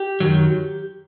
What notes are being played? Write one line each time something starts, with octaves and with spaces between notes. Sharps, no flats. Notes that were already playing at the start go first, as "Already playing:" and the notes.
Already playing: G4
F#2 D#3 F#3